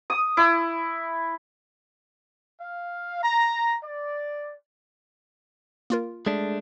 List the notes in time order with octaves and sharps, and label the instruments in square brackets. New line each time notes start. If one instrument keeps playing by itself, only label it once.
[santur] D#6
E4
[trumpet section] F5
A#5
D5
[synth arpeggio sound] A#3 F4 A#4
[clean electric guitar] G#3 A3 D4